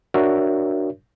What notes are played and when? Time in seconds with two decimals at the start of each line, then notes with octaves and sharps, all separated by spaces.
0.14 D4 F#4 A#4 C#5 E5